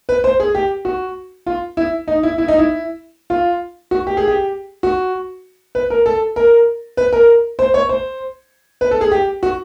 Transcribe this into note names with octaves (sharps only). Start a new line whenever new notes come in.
B4
C5
G#4
G4
F#4
F4
E4
D#4
E4
E4
D#4
E4
F4
F#4
G4
G#4
G4
F#4
B4
A#4
A4
A#4
B4
A#4
C5
C#5
C5
B4
A4
G#4
G4
F#4